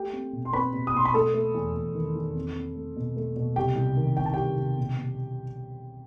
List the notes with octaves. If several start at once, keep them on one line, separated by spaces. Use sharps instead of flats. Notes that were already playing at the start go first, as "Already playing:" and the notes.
Already playing: A3 G4 G5
C4
B2
C6
C4 B4 B5
B2
D#6
B2 C6
B5
A3 A4 A5
A3
E2
E2
D#3
E2
C4
C4
A3
B2
A3
B2
C2 G4 G5
C2
D#3
C2 G5
A5
C2 G4 G5
C2
B2
B2